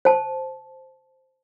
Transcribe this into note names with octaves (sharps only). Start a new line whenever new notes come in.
C5 A5